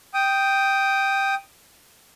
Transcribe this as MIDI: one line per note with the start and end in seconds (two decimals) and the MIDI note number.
0.14 1.35 79
0.14 1.35 87